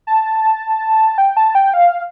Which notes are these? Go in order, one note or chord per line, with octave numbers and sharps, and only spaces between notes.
A5
G5
A5
G5
F5